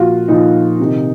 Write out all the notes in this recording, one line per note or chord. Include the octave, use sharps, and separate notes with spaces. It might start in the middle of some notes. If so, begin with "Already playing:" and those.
Already playing: A#2 F3 F4 F#4
A#2 F3 D#4
C3 D#3